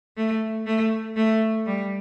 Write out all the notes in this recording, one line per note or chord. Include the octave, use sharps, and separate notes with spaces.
A3
A3
A3
G3